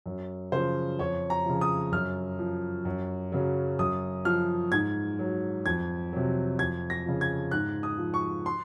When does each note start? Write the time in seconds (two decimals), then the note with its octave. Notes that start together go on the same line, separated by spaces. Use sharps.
0.06 F#2
0.52 C#3 F3 C5
0.99 F2 C#5
1.30 A#5
1.46 C#3 F3
1.61 D#6
1.92 F#2 F6
2.39 F3
2.85 F#2
3.32 C#3 F#3
3.79 F#2 D#6
4.25 F3 F6
4.72 G#2 G#6
5.19 F#3
5.66 F2 G#6
6.13 C3 F#3
6.59 F2 G#6
6.90 A#6
7.06 C#3 F3
7.21 G#6
7.51 G#2 F#6
7.83 D#6
7.99 F3
8.14 C#6
8.46 C6